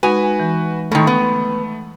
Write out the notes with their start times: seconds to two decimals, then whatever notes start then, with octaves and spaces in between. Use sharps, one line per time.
0.03 G#3 D#4 F#4 B4 G#5
0.40 E3
0.92 A2 D#3 A3 C6 C#6
1.07 B3